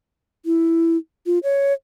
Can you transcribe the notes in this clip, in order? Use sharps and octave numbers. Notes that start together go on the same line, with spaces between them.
E4
F4
C#5